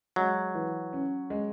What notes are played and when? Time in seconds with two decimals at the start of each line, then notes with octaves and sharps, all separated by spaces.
0.16 F#3 G#3
0.55 E3
0.93 C#4
1.30 G#3